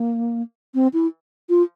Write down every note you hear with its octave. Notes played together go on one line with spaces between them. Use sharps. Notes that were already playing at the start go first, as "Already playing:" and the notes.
Already playing: A#3
C4
E4
F4